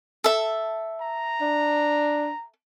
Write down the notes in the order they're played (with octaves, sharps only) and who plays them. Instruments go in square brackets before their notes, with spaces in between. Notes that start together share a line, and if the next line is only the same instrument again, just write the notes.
[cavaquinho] A4 E5
[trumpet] A#5
[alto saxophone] D4